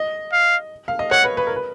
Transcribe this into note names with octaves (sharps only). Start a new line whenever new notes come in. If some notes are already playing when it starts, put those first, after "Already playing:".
Already playing: D#5
F5
F5
D#5
C#5 F#5
B4
B4
A#4
B4